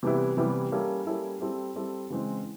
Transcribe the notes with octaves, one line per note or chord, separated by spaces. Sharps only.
C3 E3 G3 B3 E4
C3 E3 G3 B3 E4
G3 A#3 C#4 E4 A4
G3 A#3 C#4 E4 A4
G3 C4 E4 A4
G3 C4 E4 A4
C#3 E3 G#3 C4